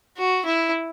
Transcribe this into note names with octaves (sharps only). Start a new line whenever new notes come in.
F#4
E4